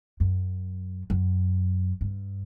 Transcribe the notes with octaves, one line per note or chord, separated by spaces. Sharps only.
F#2
F#2
G2